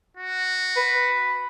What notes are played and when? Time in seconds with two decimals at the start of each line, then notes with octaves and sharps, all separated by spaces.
0.17 F#4
0.77 B4